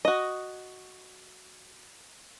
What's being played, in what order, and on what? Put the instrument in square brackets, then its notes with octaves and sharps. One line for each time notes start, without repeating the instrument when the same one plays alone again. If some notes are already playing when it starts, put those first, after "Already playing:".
[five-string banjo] F#4 D#5